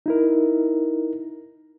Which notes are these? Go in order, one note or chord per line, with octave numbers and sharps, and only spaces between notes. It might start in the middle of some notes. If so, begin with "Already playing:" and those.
D#4 E4 A#4